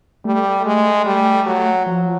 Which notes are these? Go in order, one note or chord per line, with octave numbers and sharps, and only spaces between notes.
G3 A3
G#3
G3
F#3
F3 F#3